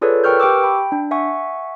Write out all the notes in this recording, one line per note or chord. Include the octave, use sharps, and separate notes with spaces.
F4 G#4 A4 B4 C#5 D5
A#4 B4 G5 C#6 F6 G6
G4 G5 C#6 D6 E6
G5 B5
D4
E5 F#5 G#5 C#6